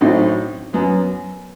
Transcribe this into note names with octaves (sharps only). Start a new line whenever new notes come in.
A1 A2 F#3 C4 D#4
F#2 F#3 B3